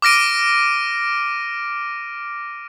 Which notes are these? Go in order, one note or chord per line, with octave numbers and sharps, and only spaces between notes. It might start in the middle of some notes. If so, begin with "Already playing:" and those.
D6 F6 A#6 D7 D#7